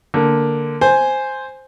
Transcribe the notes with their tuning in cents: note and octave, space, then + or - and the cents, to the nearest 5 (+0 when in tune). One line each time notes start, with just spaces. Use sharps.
D3 +0 A#3 +0
C5 +0 G#5 +0